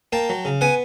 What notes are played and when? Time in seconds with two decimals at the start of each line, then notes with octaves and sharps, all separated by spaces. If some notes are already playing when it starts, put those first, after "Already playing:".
0.12 A#3 G5 A5
0.30 F#3
0.45 C#3
0.61 B3 F#5 G#5